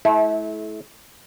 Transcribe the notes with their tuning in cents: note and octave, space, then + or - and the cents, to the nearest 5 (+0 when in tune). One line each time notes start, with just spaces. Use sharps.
A3 -35 E4 -15